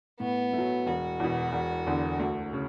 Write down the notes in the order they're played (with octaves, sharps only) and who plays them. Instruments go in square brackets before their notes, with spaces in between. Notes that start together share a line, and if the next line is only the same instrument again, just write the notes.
[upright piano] A2 [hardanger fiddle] B3
[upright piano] A3
F#3
[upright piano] E1 [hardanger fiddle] F#4
[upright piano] E2 B2
E1
E2 D3
D2
C#3